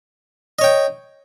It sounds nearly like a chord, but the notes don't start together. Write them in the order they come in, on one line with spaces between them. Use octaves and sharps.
D#5 C#5 G5